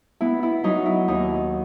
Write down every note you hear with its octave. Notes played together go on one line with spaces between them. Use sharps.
B3 E4
E4
F#3 D#4
E4
D#2 D#4